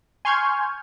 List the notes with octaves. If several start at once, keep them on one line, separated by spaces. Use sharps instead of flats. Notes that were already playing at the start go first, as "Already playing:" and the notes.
G#5 C6 C#6 F6 G6 G#6